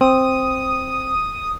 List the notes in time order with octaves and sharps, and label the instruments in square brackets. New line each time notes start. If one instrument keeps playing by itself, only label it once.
[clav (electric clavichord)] C4 [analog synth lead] D#6